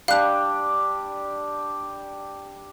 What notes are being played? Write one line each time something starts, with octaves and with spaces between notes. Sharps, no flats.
G3 D4 G4 F5 F#6